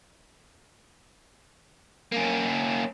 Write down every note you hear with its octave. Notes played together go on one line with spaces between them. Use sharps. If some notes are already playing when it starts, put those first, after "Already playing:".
A#3 C#4